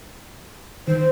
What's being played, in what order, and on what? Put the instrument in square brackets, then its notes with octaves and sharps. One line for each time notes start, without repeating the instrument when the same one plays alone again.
[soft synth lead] D#3 [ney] C5